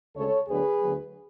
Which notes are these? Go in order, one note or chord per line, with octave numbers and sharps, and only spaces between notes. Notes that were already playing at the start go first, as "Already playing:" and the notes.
D2 C#3 G#3 A4 C#5
D2 D3 F#3 B3 G#4 B4
D2 D3 F#3 B3